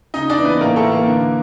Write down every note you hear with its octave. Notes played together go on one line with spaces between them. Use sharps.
C#3 D#4 D#5
D4 D5
E3
B3 B4
A2 A#3 A#4
A3 A4
E3
A#3 A#4
D3